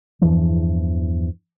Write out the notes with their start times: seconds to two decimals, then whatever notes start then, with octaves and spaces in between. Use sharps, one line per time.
0.21 E2 G2 E3 F3